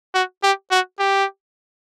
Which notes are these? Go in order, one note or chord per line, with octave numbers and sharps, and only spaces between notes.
F#4
G4
F#4
G4